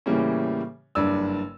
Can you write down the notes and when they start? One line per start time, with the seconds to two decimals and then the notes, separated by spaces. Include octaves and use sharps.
0.06 A2 C#3 E3 G3 A#3 C#4
0.95 F#1 G2 D5 E6